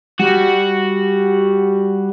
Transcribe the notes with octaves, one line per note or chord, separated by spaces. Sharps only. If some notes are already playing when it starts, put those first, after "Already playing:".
G3 F#4